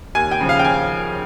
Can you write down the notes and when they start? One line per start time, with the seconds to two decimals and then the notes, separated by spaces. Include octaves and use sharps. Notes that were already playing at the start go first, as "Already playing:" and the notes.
0.15 D#2 G#5
0.31 G5
0.40 C#3 F3
0.49 F5
0.59 G5
0.65 G#5